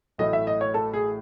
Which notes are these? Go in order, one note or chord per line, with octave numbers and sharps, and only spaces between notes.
A1 A2 F#3 A3 D#5
E5
D#5
C#5
A4
G#4